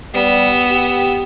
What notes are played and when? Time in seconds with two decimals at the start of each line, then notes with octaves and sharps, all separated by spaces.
0.14 G3 B3 E6
0.70 G4